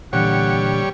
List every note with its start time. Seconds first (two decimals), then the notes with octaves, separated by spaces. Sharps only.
0.13 A#2 D3 E3 G3 C#5 F#5